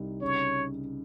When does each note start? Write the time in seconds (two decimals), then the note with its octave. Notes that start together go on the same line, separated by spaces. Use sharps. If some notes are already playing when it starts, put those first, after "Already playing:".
Already playing: C2 D#4
0.22 C#3 C#5